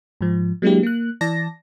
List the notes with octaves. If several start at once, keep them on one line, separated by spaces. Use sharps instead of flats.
G#2 F3
F#3 G#3 A#3 D4 E4 G4
A#3 F#6
E3 D5 A5 A#6